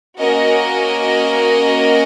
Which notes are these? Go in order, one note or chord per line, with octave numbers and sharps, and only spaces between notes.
A#3 C#4 F#4 A#4 D#5